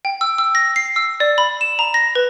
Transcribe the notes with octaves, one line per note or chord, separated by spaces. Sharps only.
G5
E6
E6
A#6
C7
E6
D5
B5
E7
A#5
A#6
B4